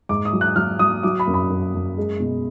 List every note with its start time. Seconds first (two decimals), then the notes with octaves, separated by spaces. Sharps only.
0.09 G#2 D6
0.25 D#6
0.33 F#3
0.41 F#6
0.56 F#3 F6
0.79 F#3 D#6
1.03 F#3 D6
1.19 B5
1.27 F#2
1.34 B5
1.50 F#2
1.74 F#2
1.98 G#3
2.20 B2